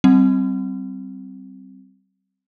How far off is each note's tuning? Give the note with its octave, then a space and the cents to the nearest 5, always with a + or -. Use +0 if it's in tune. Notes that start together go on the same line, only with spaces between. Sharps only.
G3 -25 C4 +0 F#5 +0